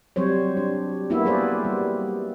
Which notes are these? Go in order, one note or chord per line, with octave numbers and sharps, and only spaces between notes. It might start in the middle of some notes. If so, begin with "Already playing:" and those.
F#3 G3 C4 C5 C#5
D4
A#3 B3 E4 F#4 E5
G3 G#4 B4 C5 D5
G3